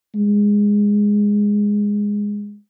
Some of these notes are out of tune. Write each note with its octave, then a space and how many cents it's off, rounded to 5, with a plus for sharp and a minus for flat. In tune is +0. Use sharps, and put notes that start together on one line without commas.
G#3 -10